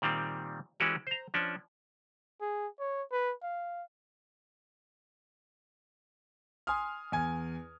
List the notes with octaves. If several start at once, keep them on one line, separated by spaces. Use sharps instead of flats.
A#2 D#3 G3 C4
E3 G#3 C#4 F#4 G4
C5 A#5
F3 C#4 D4
G#4
C#5
B4
F5
G#5 C6 D#6 F6
E2 G#5 G#6